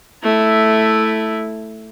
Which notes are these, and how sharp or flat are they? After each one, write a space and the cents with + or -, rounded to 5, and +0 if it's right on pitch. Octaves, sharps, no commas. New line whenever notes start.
A3 +0 E4 +0